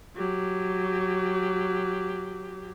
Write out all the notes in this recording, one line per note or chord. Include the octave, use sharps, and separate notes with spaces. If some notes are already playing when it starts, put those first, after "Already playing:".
F#3 G4